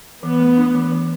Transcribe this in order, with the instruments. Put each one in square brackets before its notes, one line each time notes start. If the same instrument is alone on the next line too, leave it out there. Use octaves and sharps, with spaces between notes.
[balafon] E3 [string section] B3
[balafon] A3
D4
E3
E3